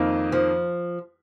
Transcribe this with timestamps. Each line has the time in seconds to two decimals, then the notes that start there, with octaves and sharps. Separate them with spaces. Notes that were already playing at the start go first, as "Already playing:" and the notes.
Already playing: F2 D#3 A#3 D#4
0.32 F3